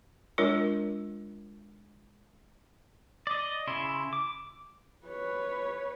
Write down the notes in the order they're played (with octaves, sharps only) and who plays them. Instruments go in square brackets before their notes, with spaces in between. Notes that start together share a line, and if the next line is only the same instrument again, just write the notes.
[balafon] G#3 D4 F4 A#4 C#5
[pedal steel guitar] D5 D#5
C#3 E4 C6
D6
[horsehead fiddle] B4 C#5